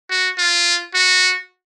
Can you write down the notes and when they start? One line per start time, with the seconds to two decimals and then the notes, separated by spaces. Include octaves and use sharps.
0.10 F#4
0.38 F4
0.94 F#4